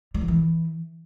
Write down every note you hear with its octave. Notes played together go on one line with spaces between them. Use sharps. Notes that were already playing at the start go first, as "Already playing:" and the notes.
G3
F3
E3